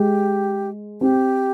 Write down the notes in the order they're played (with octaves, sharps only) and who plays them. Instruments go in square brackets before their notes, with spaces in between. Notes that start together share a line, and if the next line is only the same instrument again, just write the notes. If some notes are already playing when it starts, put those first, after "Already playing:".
Already playing: [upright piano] G#3 [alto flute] G4
[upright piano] C4 [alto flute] G4